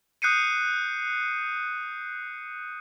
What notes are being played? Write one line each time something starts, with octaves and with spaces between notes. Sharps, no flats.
D#6 F#6 G6 C7 C#7 D#7